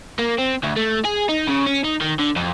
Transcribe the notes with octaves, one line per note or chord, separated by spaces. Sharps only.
A#3
C4
D2
A3
G#4
D#4
C#3
C#4
D#4
D#3
D3
F2